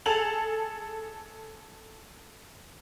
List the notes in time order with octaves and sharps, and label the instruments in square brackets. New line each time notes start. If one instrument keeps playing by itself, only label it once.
[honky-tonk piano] G#4 A4 A5 F7 F#7